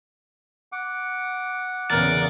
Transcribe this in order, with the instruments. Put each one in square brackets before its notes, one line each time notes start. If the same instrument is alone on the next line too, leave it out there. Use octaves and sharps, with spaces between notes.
[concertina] F#5 D6
[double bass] E2 C#3 [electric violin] A#4 [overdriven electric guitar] D5